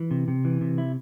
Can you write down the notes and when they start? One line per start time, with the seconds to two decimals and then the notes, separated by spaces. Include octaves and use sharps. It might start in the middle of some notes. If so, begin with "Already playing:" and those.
Already playing: E3
0.11 C3
0.28 C3
0.45 E3
0.61 C3
0.78 E4